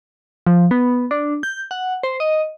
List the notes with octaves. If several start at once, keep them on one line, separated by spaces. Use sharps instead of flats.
F3
B3
D4
G6
F#5
C5
D#5